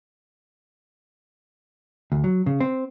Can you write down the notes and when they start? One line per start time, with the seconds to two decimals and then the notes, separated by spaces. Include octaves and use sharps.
2.12 D2
2.24 F#3
2.46 C#3
2.60 C4